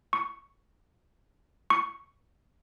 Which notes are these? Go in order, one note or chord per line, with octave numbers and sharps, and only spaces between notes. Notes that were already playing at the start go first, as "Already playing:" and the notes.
C#6
C#6